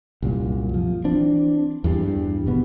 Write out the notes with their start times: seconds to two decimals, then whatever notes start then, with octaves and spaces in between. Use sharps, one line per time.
0.22 C2 F#2 A#2
0.74 F3
1.04 E3 C4 D4
1.84 E2 G2 G3
2.46 G#1 B2 B3